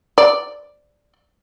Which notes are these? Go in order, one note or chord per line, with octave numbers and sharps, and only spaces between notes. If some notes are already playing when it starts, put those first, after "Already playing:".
D5